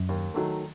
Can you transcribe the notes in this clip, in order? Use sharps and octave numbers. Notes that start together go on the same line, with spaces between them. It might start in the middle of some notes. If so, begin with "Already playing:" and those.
Already playing: F#2
D#2
D#3 F#3 A3